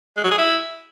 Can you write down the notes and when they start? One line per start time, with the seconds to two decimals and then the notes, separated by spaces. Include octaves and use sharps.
0.17 G#3
0.24 F#3
0.31 G#4
0.38 E4